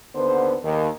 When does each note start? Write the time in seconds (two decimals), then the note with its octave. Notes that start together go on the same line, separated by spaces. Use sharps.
0.15 D#2 D3 B3 C5
0.64 D#2